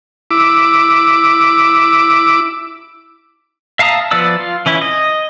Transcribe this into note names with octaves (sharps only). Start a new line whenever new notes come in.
E4 D6
E5 F5 A5 A#5 D#6
F3 B3 B4 D5 E6
F4
E3 C#4 E4
D#5